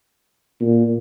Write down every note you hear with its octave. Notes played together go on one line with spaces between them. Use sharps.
A#2